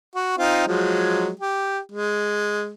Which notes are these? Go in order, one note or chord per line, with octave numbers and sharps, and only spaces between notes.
F#4
C4 D#4 F4
F3 F#3 G#3
G4
G#3